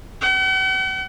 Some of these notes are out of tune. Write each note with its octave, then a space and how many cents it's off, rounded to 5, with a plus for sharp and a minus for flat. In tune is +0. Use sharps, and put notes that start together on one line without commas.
F#5 +45